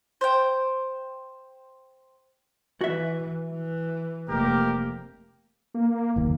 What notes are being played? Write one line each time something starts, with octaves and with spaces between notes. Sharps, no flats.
C5 G5
E3 F#4 E5
E3
F1 A#3 G4 A#4
A#3
F#1 D#2